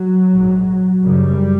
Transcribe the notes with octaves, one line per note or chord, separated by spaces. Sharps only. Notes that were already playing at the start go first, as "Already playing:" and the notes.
Already playing: F#3
A#1 G#2
F#1 F#2 C#3 G3